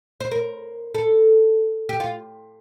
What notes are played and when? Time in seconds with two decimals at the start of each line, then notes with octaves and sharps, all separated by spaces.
0.20 C5
0.31 A#4
0.95 A4
1.89 G4
2.00 F4